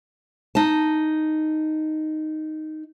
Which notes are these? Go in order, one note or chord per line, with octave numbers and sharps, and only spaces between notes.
D#4 A5